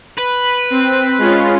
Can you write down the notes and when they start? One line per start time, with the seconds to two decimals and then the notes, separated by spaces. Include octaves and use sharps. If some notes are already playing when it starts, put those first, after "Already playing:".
0.18 B4
0.70 C4
1.18 G#3 C#4 F4